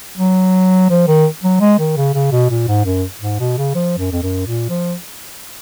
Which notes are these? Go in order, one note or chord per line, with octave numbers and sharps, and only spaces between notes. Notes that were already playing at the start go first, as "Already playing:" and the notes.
F#3
F3
D#3
F#3
G#3
D#3
C#3
C#3
B2
A#2
G#2
F#2
G#2
B2
C#3
F3
F#2
F2
F#2
A#2
F3